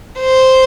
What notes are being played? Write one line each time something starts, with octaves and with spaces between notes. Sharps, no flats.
C5